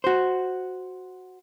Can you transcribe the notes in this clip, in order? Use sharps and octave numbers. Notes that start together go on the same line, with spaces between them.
F#4 C5